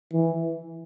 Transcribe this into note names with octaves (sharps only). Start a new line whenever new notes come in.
E3